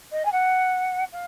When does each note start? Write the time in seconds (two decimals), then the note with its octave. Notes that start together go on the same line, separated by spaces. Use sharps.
0.12 D#5
0.25 G#5
0.32 F#5
1.12 F5